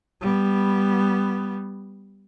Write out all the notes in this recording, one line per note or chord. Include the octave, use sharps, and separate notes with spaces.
G3 B3